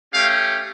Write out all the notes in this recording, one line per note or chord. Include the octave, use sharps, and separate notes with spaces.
A3 C#4 G4 F5